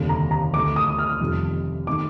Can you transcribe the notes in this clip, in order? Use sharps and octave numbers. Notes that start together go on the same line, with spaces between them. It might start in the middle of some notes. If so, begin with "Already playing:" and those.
Already playing: F1 D#2 D3 G3
A#5
A#5
D2 D3 A3 D6
D#6
F6
F1 F2 D#3 G3
D#3 A3 D6